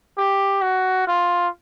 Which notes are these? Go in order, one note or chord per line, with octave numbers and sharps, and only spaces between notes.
G4
F#4
F4